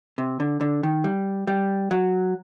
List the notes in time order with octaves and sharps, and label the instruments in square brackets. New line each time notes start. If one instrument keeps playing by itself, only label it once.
[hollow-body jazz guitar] C3
D3
D3
D#3
G3
G3
F#3